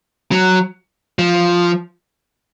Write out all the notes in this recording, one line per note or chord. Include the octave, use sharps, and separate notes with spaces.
F#3
F3